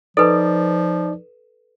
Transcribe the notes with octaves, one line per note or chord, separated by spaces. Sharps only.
F3 D#4 A4 B4 D5